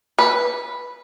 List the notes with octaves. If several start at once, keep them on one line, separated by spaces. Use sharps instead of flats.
B4